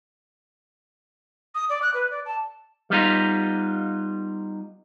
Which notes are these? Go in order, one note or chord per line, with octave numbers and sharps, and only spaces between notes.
D#6
D5
F#6
B4
D5
A5
G3 B3 D#4 F4